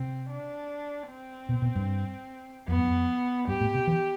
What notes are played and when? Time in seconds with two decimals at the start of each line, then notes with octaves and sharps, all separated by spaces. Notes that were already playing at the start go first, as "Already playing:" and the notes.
Already playing: C3 C4
0.30 D4
1.09 C4
1.49 B2
1.62 B2
1.75 G2
2.68 F2 B3
2.77 G2
2.87 F2
3.48 G2 G4
3.61 A2
3.75 C3
3.87 E3